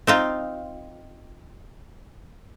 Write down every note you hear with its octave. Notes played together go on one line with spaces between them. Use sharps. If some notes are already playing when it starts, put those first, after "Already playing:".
C4 D#4 F4